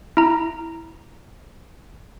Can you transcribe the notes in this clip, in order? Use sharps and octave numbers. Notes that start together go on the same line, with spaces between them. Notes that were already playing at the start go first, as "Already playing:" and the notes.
E4 A#5